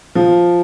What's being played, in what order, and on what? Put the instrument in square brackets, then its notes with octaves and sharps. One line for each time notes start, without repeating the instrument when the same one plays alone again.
[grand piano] F3